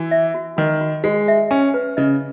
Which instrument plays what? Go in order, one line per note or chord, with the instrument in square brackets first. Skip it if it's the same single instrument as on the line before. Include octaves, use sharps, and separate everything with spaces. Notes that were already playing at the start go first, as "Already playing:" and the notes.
Already playing: [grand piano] E3 [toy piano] F#4
[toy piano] E5
F#4
[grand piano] D#3 [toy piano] F#4
[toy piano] F#4
[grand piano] G#3 [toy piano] F#4
[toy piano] E5
[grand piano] C#4 [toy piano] G#5
[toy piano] B4
[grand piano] C#3 [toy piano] D#5